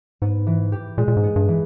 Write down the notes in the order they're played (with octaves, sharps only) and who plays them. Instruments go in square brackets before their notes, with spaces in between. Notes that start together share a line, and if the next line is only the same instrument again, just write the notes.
[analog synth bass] G#2 [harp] B3
[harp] E3
G4
[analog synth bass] A#2 [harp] G#3
[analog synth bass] A#2
G#2
[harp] B3
[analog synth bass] G2
[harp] E3